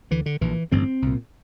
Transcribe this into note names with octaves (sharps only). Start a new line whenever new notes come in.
D2 D3 E3
D3
A#1 A#2 E3
A1 G2 D3 C4
C2 A#2